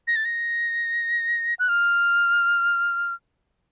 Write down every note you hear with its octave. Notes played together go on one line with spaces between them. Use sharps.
A#6
A6
A#6
F#6
F6